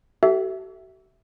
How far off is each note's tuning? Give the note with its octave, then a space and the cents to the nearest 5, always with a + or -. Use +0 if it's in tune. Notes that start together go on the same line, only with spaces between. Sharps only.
F#4 +45 A4 +0 E5 +0